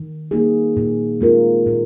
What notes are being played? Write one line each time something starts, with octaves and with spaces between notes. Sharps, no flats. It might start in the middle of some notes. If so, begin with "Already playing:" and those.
Already playing: D#3
G3 A#3 D#4 G#4
A#2
G#3 C4 F4 A#4
A#2